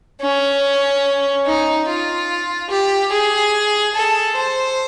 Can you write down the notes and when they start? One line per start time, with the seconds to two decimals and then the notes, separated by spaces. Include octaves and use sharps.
0.22 C#4
1.46 D#4
1.88 F4
2.70 G4
3.12 G#4
3.95 A4
4.36 C5